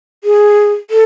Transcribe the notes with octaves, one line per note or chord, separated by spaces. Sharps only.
G#4
A4